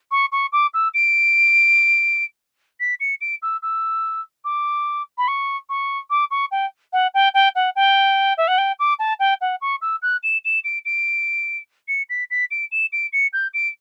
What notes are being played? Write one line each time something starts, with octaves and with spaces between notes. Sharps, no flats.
C#6
C#6
D6
E6
D7
B6
C#7
D7
E6
E6
D6
B5
C#6
C#6
D6
C#6
G5
F#5
G5
G5
F#5
G5
E5
F#5
G5
D6
A5
G5
F#5
C#6
E6
F#6
E7
E7
D7
D7
C#7
B6
B6
D7
E7
D7
C#7
G6
D7